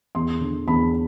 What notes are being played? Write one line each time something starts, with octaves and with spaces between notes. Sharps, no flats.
E2 C6
D3
E2 B5